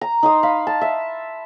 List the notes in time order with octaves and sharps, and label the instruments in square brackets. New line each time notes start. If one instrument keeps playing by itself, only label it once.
[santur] A#5
D#4 C6 D#6
F5 B5
A5
E5